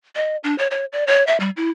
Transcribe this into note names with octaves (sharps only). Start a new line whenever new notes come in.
D#5
D4
C#5
C#5
D5
C#5
E5
G3
E4